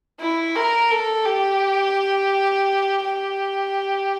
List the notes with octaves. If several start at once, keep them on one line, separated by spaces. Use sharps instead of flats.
E4
A#4
A4
G4
G4